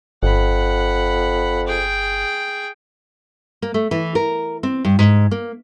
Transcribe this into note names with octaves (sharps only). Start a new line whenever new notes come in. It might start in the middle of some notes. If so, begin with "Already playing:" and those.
G1 F2 F#5 B5
G#4 G5
A#3
A3
E3
A#4
C4
G2
G#2
A#3